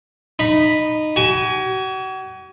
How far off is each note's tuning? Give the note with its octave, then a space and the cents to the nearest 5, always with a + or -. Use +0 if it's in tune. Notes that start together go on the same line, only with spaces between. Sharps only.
D#4 -15 B5 +0
F#4 +40 G#5 +0